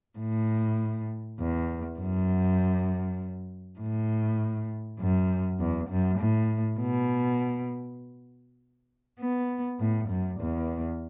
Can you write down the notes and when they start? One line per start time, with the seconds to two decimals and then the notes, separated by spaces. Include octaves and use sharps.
0.19 A2
1.40 E2
1.99 F#2
3.79 A2
4.99 F#2
5.59 E2
5.90 F#2
6.19 A2
6.80 B2
9.20 B3
9.80 A2
10.09 F#2
10.40 E2